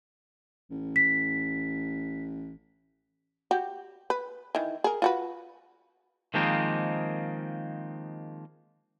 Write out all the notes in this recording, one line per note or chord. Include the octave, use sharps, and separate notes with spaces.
A1
B6
F#4 G4
B4
D#3 E3
G#4 A#4
F4 F#4 B4
D#3 F3 G#3 A#3 C4 D#4